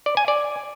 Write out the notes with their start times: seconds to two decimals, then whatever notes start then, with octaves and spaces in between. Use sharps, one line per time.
0.06 D5
0.17 G#5
0.28 D5